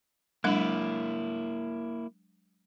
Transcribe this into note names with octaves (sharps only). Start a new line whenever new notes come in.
F#3 G#3 A#3 D4 E4